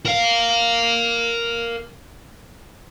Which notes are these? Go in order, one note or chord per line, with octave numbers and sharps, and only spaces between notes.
A#4 F5